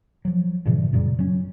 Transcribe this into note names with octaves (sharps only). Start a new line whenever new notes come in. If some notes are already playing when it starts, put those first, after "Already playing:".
F3 F#3
G2 A#2 C#3 E3
F#2 A#2 C#3 G3
F#3 C#4